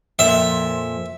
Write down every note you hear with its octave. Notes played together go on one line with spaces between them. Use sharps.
F2 A#2 F3 E5